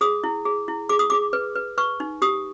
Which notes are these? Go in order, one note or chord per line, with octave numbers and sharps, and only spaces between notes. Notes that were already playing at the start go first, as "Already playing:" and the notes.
G#4 D#6
E4
G#4
E4
G#4 D6
D#6
G#4 D6
B4
B4
B4 C#6
D#4
G4 D#6